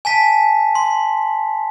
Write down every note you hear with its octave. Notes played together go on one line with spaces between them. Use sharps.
G#5 A5 B6
C6